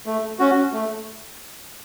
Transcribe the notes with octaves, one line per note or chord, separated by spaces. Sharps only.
A3
C#4 F#4
A3